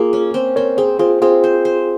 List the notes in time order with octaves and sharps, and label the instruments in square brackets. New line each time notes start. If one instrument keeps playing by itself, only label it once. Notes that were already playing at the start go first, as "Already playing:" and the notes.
Already playing: [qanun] A#3 [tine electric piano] F4 G#4
[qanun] C#4
C4
[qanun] C4 [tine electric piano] A#4 C#5
[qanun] C4 [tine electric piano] G#4 C5
[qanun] C4 [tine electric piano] F4 G#4
[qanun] C4 [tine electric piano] F4 G#4
[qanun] C5
C5